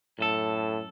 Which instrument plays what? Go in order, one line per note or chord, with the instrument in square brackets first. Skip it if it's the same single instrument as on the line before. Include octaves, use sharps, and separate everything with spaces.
[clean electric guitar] F#2 A4 [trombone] A2